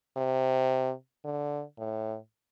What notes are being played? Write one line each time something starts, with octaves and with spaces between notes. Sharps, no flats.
C3
D3
A2